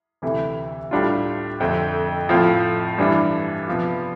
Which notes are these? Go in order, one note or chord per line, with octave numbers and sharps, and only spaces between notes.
D2 C3 E3 A3 E4
A2 G3 D4 F4
F2 D3 A3 C4
A2 F3 C4 F4
G2 E3 G3 D4
C3 F3 B3 F4